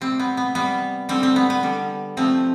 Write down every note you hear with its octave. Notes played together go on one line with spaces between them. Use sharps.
C3 G3 C4
B3
B3
C3 G3 B3
D3 G3 C4
C4
B3
B3
D3 G3
C3 F3 A3 C4